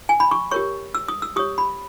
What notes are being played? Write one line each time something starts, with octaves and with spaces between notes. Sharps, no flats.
G#5
B5
C#6
G4 A#4 C#5 C#6
E6
D#6
E6
G4 C#5 D#6
B5